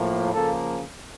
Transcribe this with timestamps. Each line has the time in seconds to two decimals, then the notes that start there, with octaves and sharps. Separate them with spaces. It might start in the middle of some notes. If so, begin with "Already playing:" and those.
Already playing: A2 F3 A#3
0.33 C#3 F3 A#3 A4